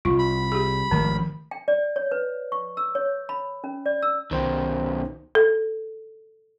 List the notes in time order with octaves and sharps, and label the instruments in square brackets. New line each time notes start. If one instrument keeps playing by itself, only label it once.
[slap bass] C2 [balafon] F4
[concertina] B5
[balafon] G4 G#4
[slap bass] G#1 F3 A3 [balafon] D#3
[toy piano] G5
D5
C#5
B4
C#6
E6
C#5
B5
C#4
D5
E6
[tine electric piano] C2 C5 G5 [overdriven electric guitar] B2 D#3
[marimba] A4